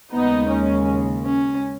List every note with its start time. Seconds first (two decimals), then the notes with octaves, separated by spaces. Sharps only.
0.13 D#2 C#3 G#3 B3 D#4
0.50 C#4
1.24 C#4